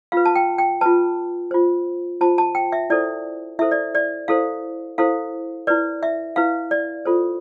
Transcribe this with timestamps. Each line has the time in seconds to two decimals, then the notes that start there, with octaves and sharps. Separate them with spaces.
0.12 F4 B4 F5
0.26 A5
0.36 G5
0.58 G5
0.81 F4 B4 A5
1.51 F4 C5
2.21 F4 C5 A5
2.38 A5
2.55 G5
2.72 E5
2.90 E4 A4 C5 D5
3.59 E4 A4 C5 E5
3.71 D5
3.95 D5
4.28 E4 A4 C5 F5
4.98 E4 A4 C5 F5
5.67 E4 B4 D5
6.03 E5
6.36 E4 B4 F5
6.71 D5
7.05 F4 A4 C5